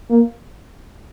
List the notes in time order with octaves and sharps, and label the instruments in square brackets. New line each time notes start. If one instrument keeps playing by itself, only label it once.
[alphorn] A#3